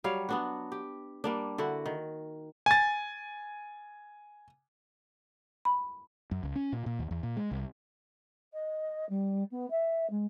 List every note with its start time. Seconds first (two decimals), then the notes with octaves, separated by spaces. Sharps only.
0.04 F#3 G3 C#5 F5
0.29 B3 D4 F#4
0.72 G4
1.24 G3 A#3 D4
1.58 D3 E4 F#4
1.86 D#3
2.66 G#5 A6
5.65 B5
6.31 F#2
6.43 C#2
6.56 C#4
6.72 A#2
6.86 A#2
6.99 D#2
7.11 E2
7.23 A#2
7.37 G#3
7.51 C2
8.53 D#5
9.09 G3
9.51 B3
9.70 E5
10.10 G#3